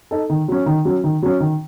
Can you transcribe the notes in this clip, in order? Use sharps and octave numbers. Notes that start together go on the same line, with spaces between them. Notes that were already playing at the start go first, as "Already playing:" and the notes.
D#4 A4
D#3
F#3 C#4
D#3
F#3 C#4
D#3
F#3 C#4
D#3